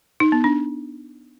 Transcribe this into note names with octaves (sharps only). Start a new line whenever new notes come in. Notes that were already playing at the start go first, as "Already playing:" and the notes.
D#4
B3
D4